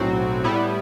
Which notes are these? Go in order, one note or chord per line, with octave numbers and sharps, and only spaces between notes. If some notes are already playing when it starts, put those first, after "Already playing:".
Already playing: B1 A2 F#3 C4 F#4
A2 G3 B3 E4